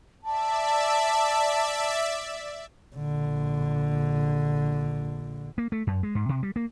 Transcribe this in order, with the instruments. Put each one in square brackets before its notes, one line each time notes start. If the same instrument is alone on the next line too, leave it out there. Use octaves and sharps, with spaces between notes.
[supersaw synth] D5 E5 [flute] A5
[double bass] A#1 D3
[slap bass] A#3
A3
F#2
G#3
G#2
C3
G3
A#3